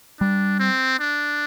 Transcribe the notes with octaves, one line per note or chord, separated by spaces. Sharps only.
G3 D4
C4
D4